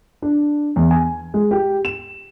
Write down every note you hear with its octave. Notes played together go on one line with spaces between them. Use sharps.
D4
E2
G#5
G#3
G4
E7